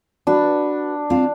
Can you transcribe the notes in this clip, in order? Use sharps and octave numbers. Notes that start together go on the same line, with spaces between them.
D4 F#4 B4
C4 F4 F5